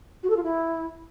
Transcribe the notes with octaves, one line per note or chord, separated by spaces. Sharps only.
F#4
A4
F4
E4